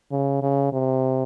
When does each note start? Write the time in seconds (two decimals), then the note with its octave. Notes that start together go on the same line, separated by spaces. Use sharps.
0.11 C#3
0.42 C#3
0.72 C3